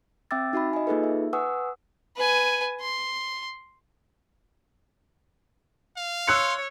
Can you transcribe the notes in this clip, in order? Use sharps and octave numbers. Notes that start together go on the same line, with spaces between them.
C4 E5 G5 D6 E6 A6
D#4 F#4 E5 B5
D#5 G#5
A#3 D#4 F4 G#4 A4 B4
E5
B4 F#5 G#5 C#6 D#6 E6
B4 G#5
C6
F5
C#5 C6 E6 F#6 C#7